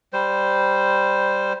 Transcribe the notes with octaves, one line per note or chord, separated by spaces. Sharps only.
G3 C5